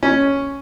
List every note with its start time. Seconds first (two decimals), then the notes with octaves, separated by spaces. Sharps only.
0.03 C#4